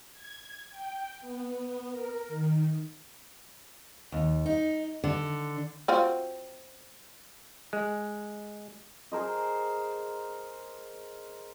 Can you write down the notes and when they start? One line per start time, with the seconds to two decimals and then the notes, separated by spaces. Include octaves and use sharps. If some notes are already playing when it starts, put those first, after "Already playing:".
0.13 G#6
0.71 G5
1.21 B3
1.91 A#4
2.28 D#3
4.12 D#2
4.46 D#4
5.04 D3
5.88 C4 F4 F#4
7.73 G#3
9.12 G#4 A#4 C5 D#5